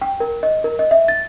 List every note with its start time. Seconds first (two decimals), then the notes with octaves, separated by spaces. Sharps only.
0.02 G5
0.20 A#4
0.43 D#5
0.64 A#4
0.79 D#5
0.91 E5
1.08 A6